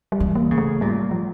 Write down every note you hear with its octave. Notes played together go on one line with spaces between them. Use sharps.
G3
E3
A#3
C#3
A3
A#2 G3
F3